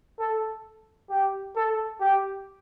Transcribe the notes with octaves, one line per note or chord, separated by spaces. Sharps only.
A4
G4
A4
G4